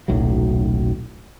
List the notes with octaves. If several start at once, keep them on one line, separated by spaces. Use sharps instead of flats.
D#1 B1 A2 F#3